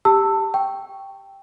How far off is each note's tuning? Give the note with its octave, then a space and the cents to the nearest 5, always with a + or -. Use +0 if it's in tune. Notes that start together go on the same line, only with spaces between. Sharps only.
G4 +0 A5 +25 E6 +0
G5 +0 C#6 +0